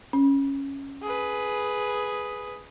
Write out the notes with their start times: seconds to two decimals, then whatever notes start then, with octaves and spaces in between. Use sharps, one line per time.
0.13 C#4
1.03 G#4 B4